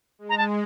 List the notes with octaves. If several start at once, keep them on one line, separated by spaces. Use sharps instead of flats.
G#3
A#5
A5